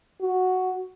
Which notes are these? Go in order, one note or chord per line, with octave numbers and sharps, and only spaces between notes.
F#4